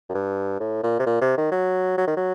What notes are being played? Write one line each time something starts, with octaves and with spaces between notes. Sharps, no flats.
F#2
G2
A2
A#2
C3
A#2
C3
D#3
F#3
F#3
D#3
F#3